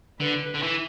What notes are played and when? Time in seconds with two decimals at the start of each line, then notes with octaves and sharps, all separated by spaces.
0.20 D3 B4
0.54 D3
0.63 E3